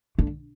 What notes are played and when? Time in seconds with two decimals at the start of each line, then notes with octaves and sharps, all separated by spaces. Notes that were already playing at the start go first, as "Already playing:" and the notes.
0.19 D3